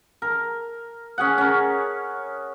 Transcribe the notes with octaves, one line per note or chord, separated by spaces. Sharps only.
A#4
C#4 G#4 F#5
C#4 A#4